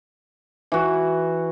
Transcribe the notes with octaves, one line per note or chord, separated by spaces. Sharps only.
E3 F#4